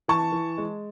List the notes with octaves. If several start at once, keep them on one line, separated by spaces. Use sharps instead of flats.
E3 A5 C#6
E3
G#3